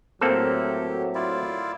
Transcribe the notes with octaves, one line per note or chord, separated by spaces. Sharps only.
A2 F#3 A#3 C4 G4 A4
E4 F4 D5